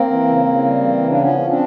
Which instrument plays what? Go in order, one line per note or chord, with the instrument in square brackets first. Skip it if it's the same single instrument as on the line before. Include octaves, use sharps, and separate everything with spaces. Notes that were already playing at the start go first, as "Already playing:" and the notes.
Already playing: [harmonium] A#3 C4
E3
C#3
C#3
G3
E3
C#3
D4
F3 B3 C#4
F3
C4 D4